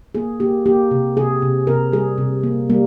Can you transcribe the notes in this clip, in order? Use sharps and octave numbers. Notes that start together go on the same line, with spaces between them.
A#3 G#4
A#3 G4
A#3 G4
C3
C3 G#4
C3
C3 A#4
G3 G#4
C3
A#3
G3 A#3